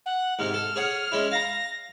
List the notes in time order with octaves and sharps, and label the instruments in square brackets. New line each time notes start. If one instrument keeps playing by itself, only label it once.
[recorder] F#5
[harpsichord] G#2 C3 [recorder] F6
[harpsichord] A4
G#4 C#5 F#5
G#3 C#4 E4
[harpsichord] F5 A#5 [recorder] A#6